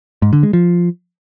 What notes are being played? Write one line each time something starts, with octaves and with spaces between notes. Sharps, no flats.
G#2
D3
G#3
F3